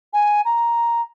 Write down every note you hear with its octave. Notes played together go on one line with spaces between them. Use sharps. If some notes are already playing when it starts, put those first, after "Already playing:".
G#5
A#5